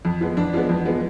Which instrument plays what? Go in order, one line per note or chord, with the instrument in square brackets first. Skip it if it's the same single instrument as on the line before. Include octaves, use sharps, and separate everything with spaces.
[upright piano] F2
F3 G#3 B3
F2 D4
F3 G#3 B3
F2
F3 G#3 B3